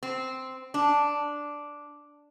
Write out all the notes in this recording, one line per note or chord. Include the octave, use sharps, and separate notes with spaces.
C4
D4